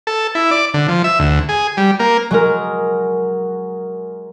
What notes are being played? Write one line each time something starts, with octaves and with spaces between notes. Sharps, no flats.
A4
E4
D5
D3
F3
E5
D2
G#4
G3
A#3
F#3 G#3 A#4